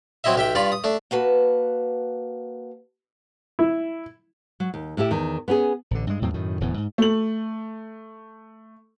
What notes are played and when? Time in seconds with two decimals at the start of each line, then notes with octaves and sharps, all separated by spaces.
0.24 F#3 C4 E4 D#5 E5
0.36 B1 G4 E5 G5
0.55 G2 F4 D5 B5
0.72 D#6
0.84 A3 D4
1.11 A#3 F#4 B4 A5
3.59 E4
4.60 F#3
4.74 D#2
4.97 A2 E4 G4 E5
5.11 E2 D#3
5.48 B3 C#4 G4 G#4
5.91 A1 D3
6.07 G2 G#3
6.21 E2 A2 F#3 C4
6.34 F#2 A2 D#3
6.60 D1 E2 A2 B3
6.78 G#2
6.98 A3 F#7